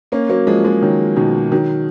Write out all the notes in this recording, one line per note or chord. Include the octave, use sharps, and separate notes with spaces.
A#3 C#4
F#3 A#3
F3 G#3
F3 G#3
D#3 F#3
B2 D#3
D#3 F#3